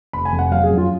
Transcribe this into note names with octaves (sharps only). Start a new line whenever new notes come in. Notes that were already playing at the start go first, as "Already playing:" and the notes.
F1 B5
G#5
F2
F#5
F#3 F5
G#4
F#2
F4